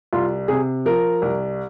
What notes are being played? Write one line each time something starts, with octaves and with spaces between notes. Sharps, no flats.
C2 F4
C3 G#4
F3 A#4
C2